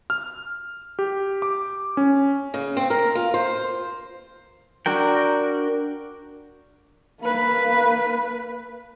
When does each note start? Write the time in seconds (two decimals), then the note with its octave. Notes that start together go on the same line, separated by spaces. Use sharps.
0.10 F6
0.99 G4
1.42 D6
1.97 C#4
2.54 C#3
2.77 C4
2.90 A#4
3.15 F4
3.34 C5
4.86 D4 F#4 A#4 G5
7.21 A#3 B4